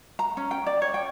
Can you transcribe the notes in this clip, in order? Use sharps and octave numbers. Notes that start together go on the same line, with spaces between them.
A#5
C#4
G5
D5
C#5
G5